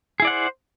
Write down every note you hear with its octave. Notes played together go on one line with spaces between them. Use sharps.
E4 G#4 C5 D5 F#5